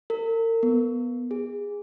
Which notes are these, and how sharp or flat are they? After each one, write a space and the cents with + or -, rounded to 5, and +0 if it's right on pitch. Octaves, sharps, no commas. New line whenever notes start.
A#4 -40
B3 -10
G#4 -20